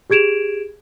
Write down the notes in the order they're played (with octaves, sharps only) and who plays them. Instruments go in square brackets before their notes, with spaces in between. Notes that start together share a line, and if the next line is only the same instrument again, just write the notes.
[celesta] G4 G#4 G#6 D7 E7 F7